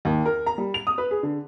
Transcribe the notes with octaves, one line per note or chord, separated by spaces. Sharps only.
D#2
A#4
A#5
G3
F7
D#6
B4
G#4
D3